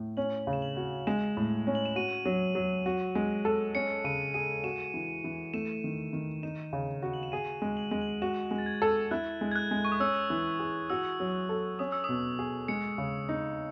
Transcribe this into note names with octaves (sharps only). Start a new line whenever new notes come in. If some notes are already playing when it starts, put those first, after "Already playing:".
Already playing: A2
C#4 F#7
C#3
E7
F#7
F#4
G#3 E7
A2
C#4
F#7
E7
F#4 D#7
F#3
F#3
F#4
G#3
A4
C#4 C#7
C#3 D#7
G#4 D#7
F#4 E7
E3
E3
A3 E7
D#3
D#3
D#4 E7
C#3
F#4
F#7
E7
G#4 D#7
G#3
F#7
G#3
F#7
F#4 E7
G#3
A6
G#6
A4
E4 F#6
G#3
G#6
F#6
G#3
C#6
D#6
C#4 E6
E3
G#4
F#4 E6
F#3
A4
C#4 D#6
E6
B2 D#6
G#4
G#3 C#7
C#3
D#4